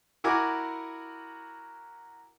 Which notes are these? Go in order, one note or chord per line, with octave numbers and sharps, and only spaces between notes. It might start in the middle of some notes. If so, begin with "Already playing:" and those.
E4 F#4 A#4 G#5 D6